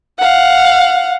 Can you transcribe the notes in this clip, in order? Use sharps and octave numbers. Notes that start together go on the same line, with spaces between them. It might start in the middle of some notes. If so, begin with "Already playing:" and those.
F5 F#5